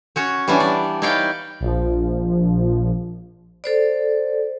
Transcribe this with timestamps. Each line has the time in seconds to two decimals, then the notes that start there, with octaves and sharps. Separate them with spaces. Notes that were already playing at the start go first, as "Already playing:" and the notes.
0.16 C#4 F#4 C#5
0.48 E3 G3 B3 C#4 D4
0.60 D5
1.02 D#4 E4 C#5 D5 F5 G5
1.60 A#1 F3
3.64 A4 C5 D5